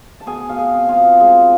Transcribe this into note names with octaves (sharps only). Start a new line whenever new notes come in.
A5
B2 G#4 G#5
B2 F5
G#4 G#5
C4
F4 F5
B2
G#3 G#4 G#5